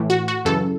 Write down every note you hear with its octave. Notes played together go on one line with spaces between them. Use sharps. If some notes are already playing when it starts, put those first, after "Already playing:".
Already playing: A2 E3
F#4
F#4
F#2 C#3 E3 A4